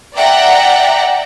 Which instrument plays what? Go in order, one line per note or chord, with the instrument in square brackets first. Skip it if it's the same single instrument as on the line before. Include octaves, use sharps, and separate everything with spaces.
[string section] D5 E5 F#5 G5 A#5